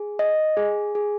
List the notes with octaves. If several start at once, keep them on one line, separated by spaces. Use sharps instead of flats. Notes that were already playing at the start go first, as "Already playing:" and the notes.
Already playing: G#4
D#5
G#4
G#4